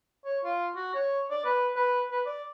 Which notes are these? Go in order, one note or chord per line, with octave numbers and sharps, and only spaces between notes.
C#5
F4
F#4
C#5
D5
B4
B4
B4
D5